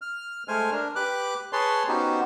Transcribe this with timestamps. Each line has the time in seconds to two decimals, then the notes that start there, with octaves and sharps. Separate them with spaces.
0.02 F6
0.48 G#3 A3 C5 G#5 F6
0.72 D4 A#4
0.96 G4 B4 D6 F#6
1.53 G#4 B4 C#5 A5 C6
1.88 B3 C#4 D#4 F#4 G4 C5